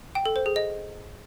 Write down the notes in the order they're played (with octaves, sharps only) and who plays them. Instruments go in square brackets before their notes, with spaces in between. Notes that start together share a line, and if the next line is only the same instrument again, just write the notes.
[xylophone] G5
A4
C5
G#4
D#5